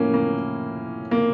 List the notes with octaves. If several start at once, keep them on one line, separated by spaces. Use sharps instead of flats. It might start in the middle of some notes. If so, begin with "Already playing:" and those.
Already playing: A2 F3 A#3 C#4
A#3
A#3